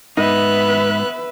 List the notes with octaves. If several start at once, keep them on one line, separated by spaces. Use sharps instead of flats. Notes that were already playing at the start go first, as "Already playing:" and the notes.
G#2 B3 D#4 B4 E5 F#6